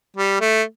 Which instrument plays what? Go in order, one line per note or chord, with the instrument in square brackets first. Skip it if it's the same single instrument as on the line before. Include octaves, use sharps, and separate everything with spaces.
[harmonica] G3
A3